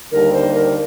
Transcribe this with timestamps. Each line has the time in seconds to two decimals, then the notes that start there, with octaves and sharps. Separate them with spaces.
0.12 D#2 D3 G3 A#4
0.33 C5
0.54 A#4